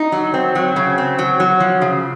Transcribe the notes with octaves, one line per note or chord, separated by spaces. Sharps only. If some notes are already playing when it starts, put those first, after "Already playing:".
Already playing: D#4
F#3
C4
F#3
C#3
C4
F#3
F#3
F3
C#3